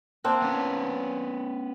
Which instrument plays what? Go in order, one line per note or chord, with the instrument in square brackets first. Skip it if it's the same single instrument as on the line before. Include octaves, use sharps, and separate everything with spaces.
[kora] A#3 C4 D4
[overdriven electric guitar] B3 C#4